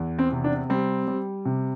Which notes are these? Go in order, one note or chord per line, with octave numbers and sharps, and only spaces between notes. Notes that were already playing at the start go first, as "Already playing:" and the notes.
Already playing: E2
C4
C3
D4
G3 C4
G3
C3